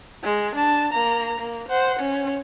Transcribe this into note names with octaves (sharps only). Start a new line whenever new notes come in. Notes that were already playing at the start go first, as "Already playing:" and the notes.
G#3
D4 A5
A#3 A#5
A#3
C5 F#5
C#4